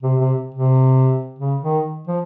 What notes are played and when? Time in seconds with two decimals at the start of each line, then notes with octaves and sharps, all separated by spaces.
0.03 C3
0.20 C3
0.55 C3
1.39 C#3
1.63 D#3
2.07 F3